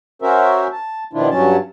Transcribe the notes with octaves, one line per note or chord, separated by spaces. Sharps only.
C#4 F#4 A#4 C5 E5
A5
B2 D#3 F3 D4 E4 F4
G2 F#3 C#4 A5